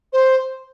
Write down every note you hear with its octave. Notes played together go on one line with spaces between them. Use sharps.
C5